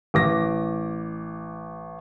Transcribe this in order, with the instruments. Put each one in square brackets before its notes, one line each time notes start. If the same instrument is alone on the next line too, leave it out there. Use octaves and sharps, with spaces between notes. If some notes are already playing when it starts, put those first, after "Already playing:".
[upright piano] A1 D6 A#6